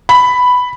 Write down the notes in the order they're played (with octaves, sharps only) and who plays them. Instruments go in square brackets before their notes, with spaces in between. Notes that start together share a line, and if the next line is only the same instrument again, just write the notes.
[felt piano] B5